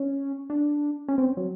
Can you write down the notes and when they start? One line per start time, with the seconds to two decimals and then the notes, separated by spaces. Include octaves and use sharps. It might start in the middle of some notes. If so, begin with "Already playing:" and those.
Already playing: C#4
0.50 D4
1.08 C#4
1.18 C4
1.37 F#3